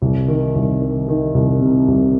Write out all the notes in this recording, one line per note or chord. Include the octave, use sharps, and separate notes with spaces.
C2
D#3
C2
D#3
D#3
C2
C3
C2